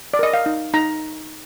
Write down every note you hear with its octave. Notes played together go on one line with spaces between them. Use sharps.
D5
A#4 D#5
F5
D#4
D#4 A#5